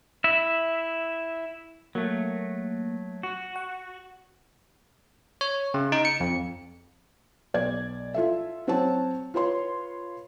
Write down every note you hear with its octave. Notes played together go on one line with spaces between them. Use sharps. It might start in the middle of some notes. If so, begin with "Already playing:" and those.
E4 E5
F#3 A3 A#3
F#4
F#5
C#5
C#3
D#4
C#7
F2
B1 D5 G#6
F4 A4 E5
F#3 C4 F#4 C#5 A5
F4 B4 C#5 C6